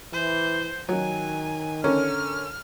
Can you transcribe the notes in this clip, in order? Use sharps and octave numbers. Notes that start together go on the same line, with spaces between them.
E3 C5
D#3 F#3 G#5
D3 C#4 A#4 F6